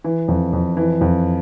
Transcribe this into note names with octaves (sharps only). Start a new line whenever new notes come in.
E3
F2
F2
E3
F2